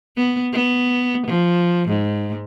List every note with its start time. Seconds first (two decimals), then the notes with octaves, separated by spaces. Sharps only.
0.17 B3
0.53 B3
1.27 F3
1.88 G#2